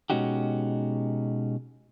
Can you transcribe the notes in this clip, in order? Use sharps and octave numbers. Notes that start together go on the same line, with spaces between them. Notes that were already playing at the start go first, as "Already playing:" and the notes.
B2 G#3 C#4 D#4 F#4 G4